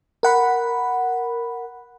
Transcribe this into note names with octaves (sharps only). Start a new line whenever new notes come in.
A#4 F#5 B5